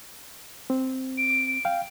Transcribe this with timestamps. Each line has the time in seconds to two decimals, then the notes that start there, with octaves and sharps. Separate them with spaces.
0.70 C4
1.18 D7
1.65 F5 G5